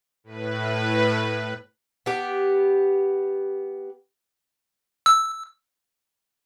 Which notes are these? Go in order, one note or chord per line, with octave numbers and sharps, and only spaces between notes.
A2 B4
B3 G4
E6